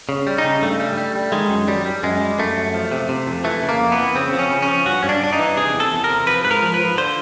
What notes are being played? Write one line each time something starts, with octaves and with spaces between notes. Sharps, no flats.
C#3
G3
D#4
C#3
G2 A3
G3
G3
G3
D#3 G#3
F#2
F#2 G3
G3
F#2 G#3
G3
F#2 A3
F#2
F3
C3
C3
F2
E3 A3
C#3
A#3
F2
B3
E3
C#3 C4
F3
C#4
C#3
C#4
F3
G2 F#4
G2 C#4
D4
G2 D4
D#4
E3
C3 G#4
E2
A4
E2
A#4
C3
F3 B4
G#2 B4
A#4
F3
B4
F3
D3 C5